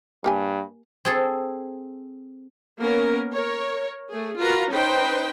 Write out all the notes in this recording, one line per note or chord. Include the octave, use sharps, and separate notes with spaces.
G2 A#3 G4 G#5
C4 G#4 A4
A#3 B3 C#4 A#4
A#4 C#5
A3 G#4
F4 F#4 A#4 B4 A#5
C#4 D#4 B4 C5 G5